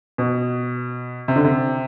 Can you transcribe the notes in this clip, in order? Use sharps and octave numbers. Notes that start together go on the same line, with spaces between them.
B2
C3
D3
C3